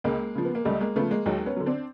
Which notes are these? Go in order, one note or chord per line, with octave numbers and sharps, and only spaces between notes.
C#2 G#3 A#3
C#3 F3
B3
A#3
C#2 G3 A3
G#3 A#3
C#3 F3 A3 B3
G#3 A#3
D#2 F#3 G#3
B3 C#4
D3 F#3
C4 D4